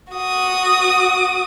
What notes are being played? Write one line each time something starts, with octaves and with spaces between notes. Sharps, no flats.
F#4 D#6